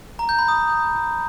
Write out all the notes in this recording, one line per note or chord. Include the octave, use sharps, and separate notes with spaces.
A#5
G6
B5
D#6